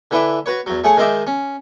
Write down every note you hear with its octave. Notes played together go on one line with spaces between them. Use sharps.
D3 E3 E4 B4 E5 D6
F#4 B4 C#5
E2 F#3
A3 G#4 C#5 F#5 G#5
D#3 G#3 C5 D#5 E5 D6
C#4